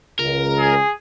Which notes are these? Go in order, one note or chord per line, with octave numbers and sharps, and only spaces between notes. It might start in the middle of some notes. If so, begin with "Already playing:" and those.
C#2 A#4
G#4